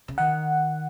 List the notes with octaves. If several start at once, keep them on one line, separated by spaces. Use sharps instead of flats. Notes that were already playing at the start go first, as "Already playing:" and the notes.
C#3
D#3 F#5